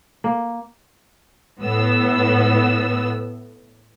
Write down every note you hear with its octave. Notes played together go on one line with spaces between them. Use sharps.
A#3
A2 B3 E6